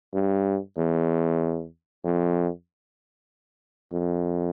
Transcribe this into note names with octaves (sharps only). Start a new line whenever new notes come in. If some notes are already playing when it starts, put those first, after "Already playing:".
G2
E2
F2
F2